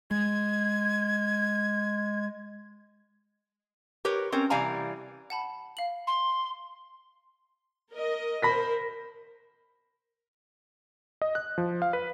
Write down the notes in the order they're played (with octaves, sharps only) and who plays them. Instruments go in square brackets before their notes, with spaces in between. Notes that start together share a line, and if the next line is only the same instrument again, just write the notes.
[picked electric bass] G#3 [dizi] G#6
[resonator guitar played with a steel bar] G4 A#4 B4 C#5
C4 C#4 A#4
C3 E3 G3 F5 G#5 A#5
[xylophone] F#5 A5 B5
F5 F#7
[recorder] C6
[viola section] A#4 D#5
[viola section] A#4 C5 [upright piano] B5 A#6 B6
[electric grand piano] D#5
F#6
F3
F5
B4